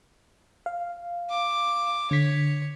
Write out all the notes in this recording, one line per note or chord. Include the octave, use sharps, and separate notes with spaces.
F5
D6
D3 C#5 B6